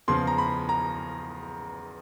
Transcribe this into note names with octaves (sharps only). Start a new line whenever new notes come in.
E2 C#3 F3 C6
A#5
B5
A#5